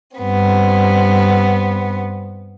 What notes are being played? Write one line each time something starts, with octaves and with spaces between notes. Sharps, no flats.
G2 B3 C4